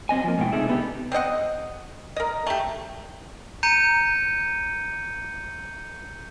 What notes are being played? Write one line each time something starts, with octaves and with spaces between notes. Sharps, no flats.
F#3 C4 D#5 G#5
F3 A#3
G#2 B2 E4 G5
C3 A3 D#4 G#4 E5
D3 B3 G4
C4 C5 D#5 F#5
A#4 D#5
A3 G4
A#5 G6 C#7 D#7